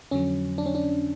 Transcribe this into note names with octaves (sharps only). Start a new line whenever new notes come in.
F2 D3 F#3 C#4
D4
C#4
D4